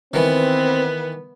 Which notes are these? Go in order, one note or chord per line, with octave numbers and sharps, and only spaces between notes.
D#3 E3 B3 C4 B4